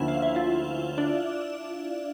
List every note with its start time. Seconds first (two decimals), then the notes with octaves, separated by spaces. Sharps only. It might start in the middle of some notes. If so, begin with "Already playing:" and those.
Already playing: D2 D3 F3 A#3 C#4 E4 E5
0.08 F5
0.22 E5
0.35 F4 F5
0.98 D4 D5